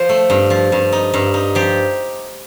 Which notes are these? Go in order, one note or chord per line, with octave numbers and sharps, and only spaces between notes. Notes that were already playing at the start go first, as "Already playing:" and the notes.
Already playing: F3 C5
A3
G2
F3
G2
D#4
G2
D#4
F3 G4